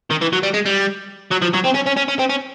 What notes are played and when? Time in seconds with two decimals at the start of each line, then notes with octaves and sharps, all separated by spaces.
0.10 D#3
0.21 E3
0.33 F#3
0.43 G3
0.54 G#3
0.66 G3
1.31 F#3
1.42 F3
1.53 F#3
1.64 C4
1.74 C#4
1.86 C#4
1.97 C#4
2.08 C#4
2.19 C4
2.29 C#4